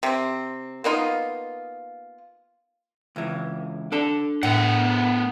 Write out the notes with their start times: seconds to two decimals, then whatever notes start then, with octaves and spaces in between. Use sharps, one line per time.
0.03 C3 C4
0.84 A#3 B3 D#4 F4
3.16 C#2 E3
3.92 D4 A4 A5
4.43 A2 B3 A#4 F#5